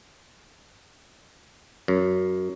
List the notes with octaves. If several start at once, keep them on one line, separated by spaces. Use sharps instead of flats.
F#2